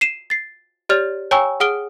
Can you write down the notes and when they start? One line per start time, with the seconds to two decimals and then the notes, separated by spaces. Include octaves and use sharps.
0.01 C7 D#7 E7
0.30 A6 C7
0.89 G4 C#5 D5 F6 A6 F7
1.31 C#5 G5 G#5 A#5 C#6 E6
1.60 G#4 F#5 D#6 F6 D7 G7